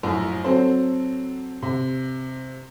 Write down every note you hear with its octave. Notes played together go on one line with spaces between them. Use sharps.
A#1 F#2 A2
F#3 C4 A4 C5
C3